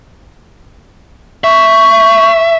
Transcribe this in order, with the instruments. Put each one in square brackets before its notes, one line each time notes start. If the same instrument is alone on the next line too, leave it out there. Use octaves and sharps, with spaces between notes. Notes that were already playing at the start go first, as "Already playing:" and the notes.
[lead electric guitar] E5 [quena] C#6